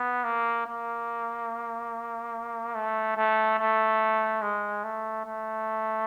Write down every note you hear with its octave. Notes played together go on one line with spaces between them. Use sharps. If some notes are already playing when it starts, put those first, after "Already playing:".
Already playing: B3
A#3
A#3
A3
A3
A3
G#3
A3
A3